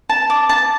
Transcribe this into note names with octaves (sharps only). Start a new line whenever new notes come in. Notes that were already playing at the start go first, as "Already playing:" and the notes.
A5
D6
A5